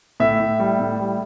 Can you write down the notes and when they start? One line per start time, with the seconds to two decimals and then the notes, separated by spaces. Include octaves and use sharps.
0.20 A2 E5
0.40 A2
0.60 G3
0.80 A2
1.00 G3